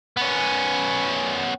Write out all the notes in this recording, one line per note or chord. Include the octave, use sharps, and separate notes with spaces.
B3 C#4